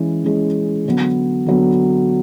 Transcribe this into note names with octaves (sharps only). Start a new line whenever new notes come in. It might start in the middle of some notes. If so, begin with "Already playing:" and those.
Already playing: E3 G#3 C#4
E3 G#3 C#4
D3 F#3 B3
D3 F#3 B3